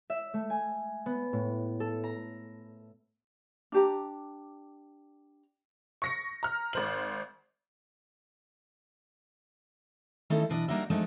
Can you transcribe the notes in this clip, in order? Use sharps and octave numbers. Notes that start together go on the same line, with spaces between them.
E5
A3
G#5
B3
A2
A4
A#5
D4 G4 A#5
C#6 A#6 C#7
A#5 F6
G#1 C5 F#7
D#3 A3 C#4 D#4 E4 A4
B2 E3 D4 D#5
G3 A#3 D4 D#4 F#4 E5
F3 G#3 A3 D4 D#4